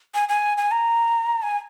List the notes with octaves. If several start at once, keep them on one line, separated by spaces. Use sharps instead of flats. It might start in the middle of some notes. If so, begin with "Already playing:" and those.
G#5
G#5
G#5
A#5
G#5